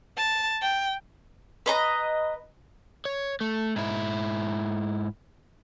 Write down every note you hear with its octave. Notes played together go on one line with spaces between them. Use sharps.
A5
G5
B4 D#5 A#5
C#5
A3
G#2 E4